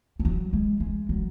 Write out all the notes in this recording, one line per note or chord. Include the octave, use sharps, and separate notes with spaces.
F3
F#3
G#3
G#3
F#3